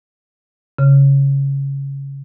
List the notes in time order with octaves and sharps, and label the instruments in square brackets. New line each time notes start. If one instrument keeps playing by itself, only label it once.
[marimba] C#3